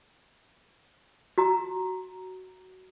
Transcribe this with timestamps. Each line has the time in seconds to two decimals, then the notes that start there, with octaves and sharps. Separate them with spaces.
1.38 F#4 A#5